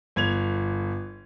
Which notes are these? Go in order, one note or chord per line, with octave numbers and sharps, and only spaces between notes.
G1 G#6 F7